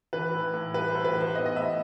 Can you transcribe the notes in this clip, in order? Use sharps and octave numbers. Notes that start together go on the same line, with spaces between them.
E3 B4
A2
A2
G3 B4
C5
A2
B4
E3
C5
B3 D#5
D#5
A2 E5